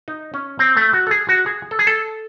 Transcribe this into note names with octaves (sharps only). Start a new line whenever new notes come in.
D#4
C#4
C4
A3
F#4
A4
G#4
F#4
G#4
A4
G#4
A4